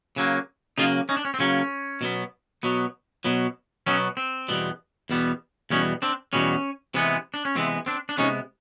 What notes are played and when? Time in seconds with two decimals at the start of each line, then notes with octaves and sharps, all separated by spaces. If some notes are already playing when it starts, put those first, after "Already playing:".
0.16 C#3 F#3 A#3
0.78 C#3 F#3 A#3 D#4 F4
1.09 C#4 D#4
1.17 D4
1.25 C#4
1.34 C4
1.40 C#3 F#3 A#3 C#4
2.01 B2 F#3 B3
2.63 B2 F#3 B3
3.25 B2 F#3 B3
3.86 B2 F#3 B3 C#4
4.17 C4
4.49 E2 B2 G3 B3
5.10 E2 B2 G3 B3
5.70 E2 B2 G3 B3 C#4
6.02 C4 D4
6.33 E2 B2 G3 B3 C#4
6.94 C3 E3 G#3 B3
7.34 D4
7.45 C#4
7.56 C3 E3 G#3 B3 C4
7.86 C4 D4
8.09 D4
8.17 C3 E3 G#3 B3 C#4 D#4